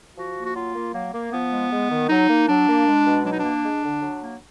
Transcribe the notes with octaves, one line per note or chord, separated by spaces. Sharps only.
F3 F#4
A#3
F#4
F#3 F4
A#3
F#3 A#3
A#3
F3 B3
G#3
G#3
D#3
F#3 D#4
A#3
F#3 D4
A#3
G#3
B2
F#3 D4
D#4
D4
A#3
G#3
D3
F#3
A#3